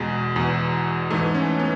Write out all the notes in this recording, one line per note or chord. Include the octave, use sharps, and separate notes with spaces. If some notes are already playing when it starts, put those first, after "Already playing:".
Already playing: E2 B2 G#3
E2 B2
G#2 E3 A3
C#4
B3